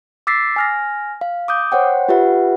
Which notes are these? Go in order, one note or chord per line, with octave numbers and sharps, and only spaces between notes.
D6 E6 A6 B6 C7
G#5 F6 A#6
F5
D6 D#6 G6
C5 C#5 F#5 G5
F4 G4 B4 E5 F#5